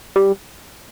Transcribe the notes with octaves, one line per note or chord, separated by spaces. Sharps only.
G3